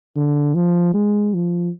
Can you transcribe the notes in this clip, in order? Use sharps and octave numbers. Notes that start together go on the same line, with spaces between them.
D3
F3
G#3
F3